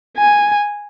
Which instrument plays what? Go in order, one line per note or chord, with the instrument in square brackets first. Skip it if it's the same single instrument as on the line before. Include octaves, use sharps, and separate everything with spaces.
[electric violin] G#5